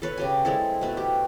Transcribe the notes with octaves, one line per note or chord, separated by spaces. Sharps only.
A4 B4 C#5
C#3 G4 G#5
G#3 C4 E4 A4
B2 A3 B4
G4